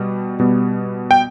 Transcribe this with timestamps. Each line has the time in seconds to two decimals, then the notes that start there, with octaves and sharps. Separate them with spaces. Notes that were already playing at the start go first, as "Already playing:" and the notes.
Already playing: B2 G3
0.39 B2 G3 B3
1.11 G5